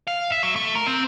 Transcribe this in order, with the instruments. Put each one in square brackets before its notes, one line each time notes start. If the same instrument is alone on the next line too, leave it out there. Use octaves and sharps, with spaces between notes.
[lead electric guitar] F5
E5
F#3
A3
A#4
C4